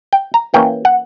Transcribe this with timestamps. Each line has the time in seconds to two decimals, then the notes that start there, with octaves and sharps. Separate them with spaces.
0.13 G5
0.34 A#5
0.54 E3 A#3 C#4 G5
0.85 F#5